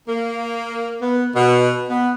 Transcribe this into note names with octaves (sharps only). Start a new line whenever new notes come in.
A#3
B3
B2
B3